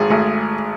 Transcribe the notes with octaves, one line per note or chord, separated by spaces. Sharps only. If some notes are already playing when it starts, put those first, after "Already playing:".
Already playing: G#1 G#2 G#4 A4
G#1 A3